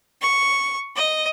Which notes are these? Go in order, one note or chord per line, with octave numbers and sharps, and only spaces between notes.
C#6
D#5